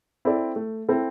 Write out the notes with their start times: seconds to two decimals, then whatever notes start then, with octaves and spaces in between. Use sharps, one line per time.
0.25 C4 E4 A4 D5
0.56 A3
0.89 C4 E4 A4